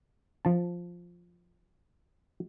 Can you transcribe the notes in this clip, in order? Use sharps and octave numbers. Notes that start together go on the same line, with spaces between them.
F3 A5